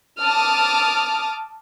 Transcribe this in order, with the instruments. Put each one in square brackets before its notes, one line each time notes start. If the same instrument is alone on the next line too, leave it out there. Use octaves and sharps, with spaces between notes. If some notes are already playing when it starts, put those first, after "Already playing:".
[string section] A5 D6 D#6 F6